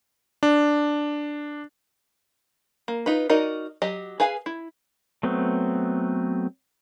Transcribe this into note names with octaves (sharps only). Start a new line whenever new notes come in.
D4
A#3
D#4 F4 B4
D#4 F#4 A#4 D5 D#5
F#3 G4 D#5
G#4 B4 F5 G#5
E4
F#3 A3 B3 C4